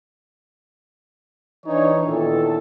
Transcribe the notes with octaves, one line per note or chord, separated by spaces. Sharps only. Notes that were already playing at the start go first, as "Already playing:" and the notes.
E3 D4 D#4 C#5
A#2 D#3 B3 E4 A4